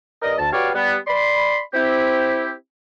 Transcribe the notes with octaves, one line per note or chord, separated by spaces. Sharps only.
G2 A#4 D5 D#5
D2 A5
F#4 G4 B4 C#5 D5 F5
G3 B3
D5 B5 C6
C4 E4 G4